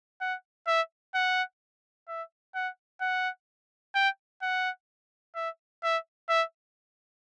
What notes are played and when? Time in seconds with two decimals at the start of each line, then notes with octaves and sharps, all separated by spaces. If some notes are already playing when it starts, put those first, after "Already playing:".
0.21 F#5
0.67 E5
1.15 F#5
2.08 E5
2.55 F#5
3.01 F#5
3.95 G5
4.42 F#5
5.35 E5
5.83 E5
6.29 E5